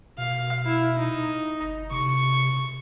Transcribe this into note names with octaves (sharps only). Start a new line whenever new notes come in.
B2 F5
E4
D#4
G1
C3 C#6